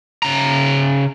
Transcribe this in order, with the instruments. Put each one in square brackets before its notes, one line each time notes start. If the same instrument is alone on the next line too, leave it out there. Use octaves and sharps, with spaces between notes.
[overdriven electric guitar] C#3 A#5